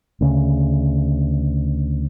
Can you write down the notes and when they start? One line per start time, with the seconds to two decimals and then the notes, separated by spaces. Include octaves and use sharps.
0.21 D2 C#3